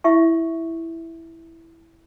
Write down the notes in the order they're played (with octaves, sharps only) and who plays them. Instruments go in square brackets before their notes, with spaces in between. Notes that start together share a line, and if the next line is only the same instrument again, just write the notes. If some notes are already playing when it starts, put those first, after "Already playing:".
[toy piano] E4 E5 C#6